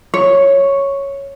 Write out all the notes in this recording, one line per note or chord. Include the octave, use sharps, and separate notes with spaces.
C#5